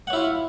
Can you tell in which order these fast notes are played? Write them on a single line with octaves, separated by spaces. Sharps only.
F#5 C#5 E4 F4